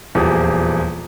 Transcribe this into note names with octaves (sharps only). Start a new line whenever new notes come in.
D#1 E2 F3 G4 G#4 D#6